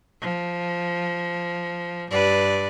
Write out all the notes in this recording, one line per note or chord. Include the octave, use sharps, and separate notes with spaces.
F3
G2 B4 D5